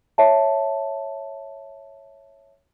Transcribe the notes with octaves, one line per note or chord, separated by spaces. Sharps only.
C#5 E5 A5